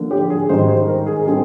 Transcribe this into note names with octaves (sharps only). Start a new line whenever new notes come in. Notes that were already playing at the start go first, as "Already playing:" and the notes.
Already playing: D3 F3 A#3
G4
G#4
G#2 D#3 G3 C5
C5
A#4
G#4
D3 G3 C4 G#4